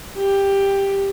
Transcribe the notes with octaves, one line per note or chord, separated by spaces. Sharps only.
G4